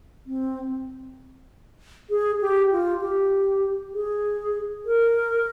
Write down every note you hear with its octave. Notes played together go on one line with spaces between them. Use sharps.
C4
G#4
G4
F4
G4
G#4
A#4